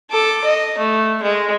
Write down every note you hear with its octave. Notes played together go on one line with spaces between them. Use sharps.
A4 D6
D#5
A3
G#3